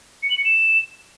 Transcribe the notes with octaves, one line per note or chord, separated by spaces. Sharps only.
C#7
F#7
C#7
E7